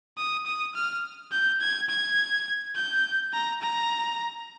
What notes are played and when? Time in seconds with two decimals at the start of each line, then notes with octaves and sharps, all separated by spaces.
0.17 D#6
0.46 D#6
0.75 F6
1.32 G6
1.61 G#6
1.89 G#6
2.76 G6
3.33 A#5
3.61 A#5